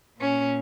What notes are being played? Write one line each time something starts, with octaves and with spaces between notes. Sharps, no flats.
A#2 C#4